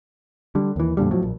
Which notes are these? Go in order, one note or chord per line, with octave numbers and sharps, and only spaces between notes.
D3 G3
D#2 E3
F2 A#2 D3 G3
F2 A2 F3 F#3
A#1